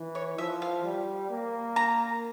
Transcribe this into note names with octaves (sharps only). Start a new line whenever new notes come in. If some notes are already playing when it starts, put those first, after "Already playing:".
Already playing: E3
C#5
F3 E5
F5
G3
A#3
A#5